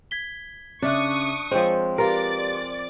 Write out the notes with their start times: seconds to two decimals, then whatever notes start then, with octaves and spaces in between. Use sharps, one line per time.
0.11 G#6 B6 G7
0.82 C#3 D4 E5 C#6 D#6 F#6
1.51 F3 G#3 C4 C5 C#5 G5
1.98 F4 G4 A#4 B4 D5 F5 D6 A6